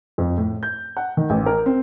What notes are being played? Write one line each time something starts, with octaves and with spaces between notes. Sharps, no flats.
F2
A2
G6
F#5
D#3
A1
A#4
C4